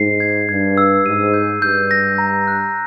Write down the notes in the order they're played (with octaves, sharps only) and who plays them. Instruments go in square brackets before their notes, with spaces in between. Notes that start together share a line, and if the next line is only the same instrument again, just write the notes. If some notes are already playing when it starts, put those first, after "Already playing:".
Already playing: [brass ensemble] G#2 [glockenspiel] C7
[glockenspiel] G#6
[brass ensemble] G2 [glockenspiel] G#6
[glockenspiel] E6
[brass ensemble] G#2 [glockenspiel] D#7
[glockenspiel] G6
[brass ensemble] G2 [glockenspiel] G6
[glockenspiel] A#6
A#5
F#6